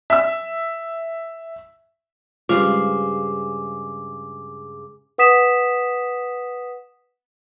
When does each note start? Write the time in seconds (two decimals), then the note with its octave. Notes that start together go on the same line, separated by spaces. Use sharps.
0.10 E5 E6
2.49 G2 C#3 G#3 F4 C5 F5 D6
5.18 B4 F#5 D#6 B6 E7